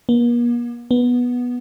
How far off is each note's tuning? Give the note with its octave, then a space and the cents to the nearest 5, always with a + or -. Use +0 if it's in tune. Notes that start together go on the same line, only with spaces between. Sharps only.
A#3 +45
B3 -10